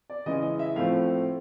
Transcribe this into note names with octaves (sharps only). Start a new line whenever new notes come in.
D5
C#3 E3 G#3 C#4 D#5
D#5
E5
A2 F3 A3 C4 F5